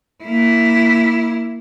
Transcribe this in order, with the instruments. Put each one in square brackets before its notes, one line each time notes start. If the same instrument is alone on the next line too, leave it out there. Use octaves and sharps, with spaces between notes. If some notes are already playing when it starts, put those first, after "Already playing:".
[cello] A#3 E4